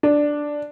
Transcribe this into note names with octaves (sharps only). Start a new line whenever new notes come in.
D4